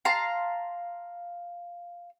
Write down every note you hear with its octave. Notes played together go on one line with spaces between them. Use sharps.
F5 A5 A#5 C6